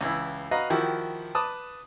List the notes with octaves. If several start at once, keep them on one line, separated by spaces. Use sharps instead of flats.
C#2 E3 E4
F#4 B4 D#5 F5 A#5
D#3 F3 E4 F#4 G4
B4 A5 D6 D#6